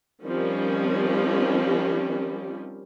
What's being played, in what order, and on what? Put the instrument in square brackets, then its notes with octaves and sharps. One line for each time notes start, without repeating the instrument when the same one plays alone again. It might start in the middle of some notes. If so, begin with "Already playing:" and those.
[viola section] D#3 F3 G3 C4 C#4